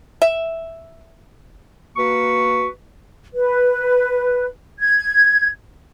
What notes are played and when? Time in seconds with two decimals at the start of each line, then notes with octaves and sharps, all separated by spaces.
0.22 E5
1.96 A#3 F#4 B4 C#6
3.34 B4
4.79 G#6